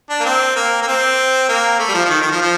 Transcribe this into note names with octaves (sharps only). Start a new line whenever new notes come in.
D4
A#3
C4
A#3
A#3
C4
A#3
A3
G3
F3
F3
D#3
D#3
F3
F3